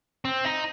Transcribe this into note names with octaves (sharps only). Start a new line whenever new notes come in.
C4
D#4